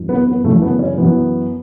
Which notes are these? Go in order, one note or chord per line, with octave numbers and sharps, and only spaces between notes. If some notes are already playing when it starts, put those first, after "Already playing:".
Already playing: F#2 E3
B3
B3
F#2 C#3 E3 A3
B3
C#4
F#2 E3 B3